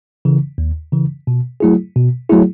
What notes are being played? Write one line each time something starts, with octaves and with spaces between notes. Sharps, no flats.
C#3 E3
D#2
C#3 E3
B2
F#3 A3 E4 G#4
B2
F#3 A3 E4 G#4